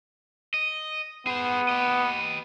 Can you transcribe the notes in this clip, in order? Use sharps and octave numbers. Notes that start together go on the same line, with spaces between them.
D#5
B3 G#4 C5
G4 D#5